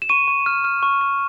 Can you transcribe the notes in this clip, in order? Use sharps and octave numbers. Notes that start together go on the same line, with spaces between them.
E7
C#6 D#7
C#6
F6
F6
C#6
C#6